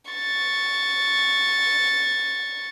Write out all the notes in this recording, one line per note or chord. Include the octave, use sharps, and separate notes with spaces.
C#6 A6